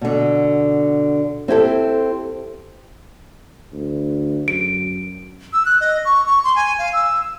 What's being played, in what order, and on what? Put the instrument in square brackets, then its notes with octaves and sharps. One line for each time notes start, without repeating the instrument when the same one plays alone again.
[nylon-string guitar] B2 D3
C4 E4 G4 A4
[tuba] D2
[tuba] F#2 [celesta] D7
[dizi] E6
F#6
D#5
C#6
C#6
C6
G#5
F5
E6